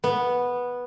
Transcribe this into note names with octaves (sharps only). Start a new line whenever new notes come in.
B3